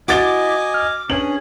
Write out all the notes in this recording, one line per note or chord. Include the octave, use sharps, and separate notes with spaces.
E4 F#4 D#5 G#5 D6 A6 G7
F6
C#4 D4 G#4 B4 G#5 F#7